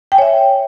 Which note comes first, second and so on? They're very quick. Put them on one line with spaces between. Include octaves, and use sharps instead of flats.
G5 G#5 C#5 E5